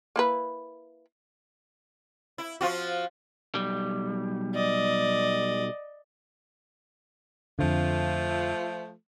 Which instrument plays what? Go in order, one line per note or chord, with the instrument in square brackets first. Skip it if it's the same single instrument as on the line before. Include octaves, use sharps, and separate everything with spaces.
[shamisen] A#3 E4 B4
[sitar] E4
F3 F4 F#4
[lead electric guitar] B1 G3
[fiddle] D5 D#5
[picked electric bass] F2 D3 [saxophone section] F3 A3 F4